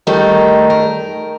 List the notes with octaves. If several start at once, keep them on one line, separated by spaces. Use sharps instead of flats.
D#3 G3 A3 D#4
A#4